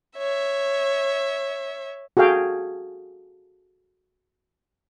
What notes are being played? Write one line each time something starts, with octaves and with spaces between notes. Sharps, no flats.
C#5 E5
F#4 G#4 A4 F5 G5